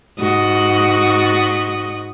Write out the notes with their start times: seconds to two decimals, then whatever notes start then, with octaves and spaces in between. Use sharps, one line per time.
0.19 G#2 F#4 D#5